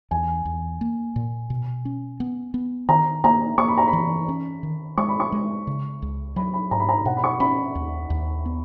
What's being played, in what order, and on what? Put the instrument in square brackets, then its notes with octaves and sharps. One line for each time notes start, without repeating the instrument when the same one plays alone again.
[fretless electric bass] E2 [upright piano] G#5
[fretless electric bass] E2
A#3
A#2
B2
C#4
B3
B3
[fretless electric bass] D#3 [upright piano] A#5
[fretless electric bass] A#3 [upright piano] A#5
[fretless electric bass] A#3 [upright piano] C#6
[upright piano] B5
A#5
B5
[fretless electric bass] E3
C#4
D#3
[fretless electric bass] G#3 [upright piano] C#6
[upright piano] B5
C#6
[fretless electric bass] G#3
C#3
C#2
[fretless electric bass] F#3 [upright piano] B5
[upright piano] B5
[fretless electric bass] G#2 [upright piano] A#5
[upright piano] B5
A#5
[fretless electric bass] B2 [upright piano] F#5
[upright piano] B5
C#6
[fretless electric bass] C#4 [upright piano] B5
[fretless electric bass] D#2
D#2
B3